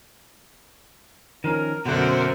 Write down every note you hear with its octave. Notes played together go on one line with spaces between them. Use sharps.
D#3 F3 C#4 A#4
F#2 B2 D3 A#4 C5 E5 F#5